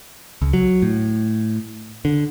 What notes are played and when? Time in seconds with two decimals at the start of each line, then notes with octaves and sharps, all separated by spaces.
0.42 C#2
0.53 F#3
0.82 A2
2.05 D3